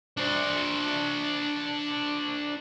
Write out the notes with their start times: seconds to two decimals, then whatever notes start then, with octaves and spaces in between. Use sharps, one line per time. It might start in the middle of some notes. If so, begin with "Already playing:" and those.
0.17 D4 C5